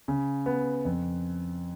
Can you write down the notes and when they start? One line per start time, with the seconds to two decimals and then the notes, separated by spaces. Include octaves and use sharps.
0.08 C#3
0.46 B3
0.85 F2